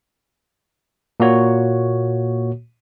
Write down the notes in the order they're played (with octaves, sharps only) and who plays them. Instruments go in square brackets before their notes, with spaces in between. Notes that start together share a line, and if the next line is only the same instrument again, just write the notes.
[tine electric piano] A#2 A#3 F#4 C#5